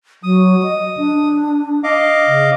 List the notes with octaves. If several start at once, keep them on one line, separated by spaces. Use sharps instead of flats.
F#3 D#6
D#5
D4
D#5 F5 D6
C#3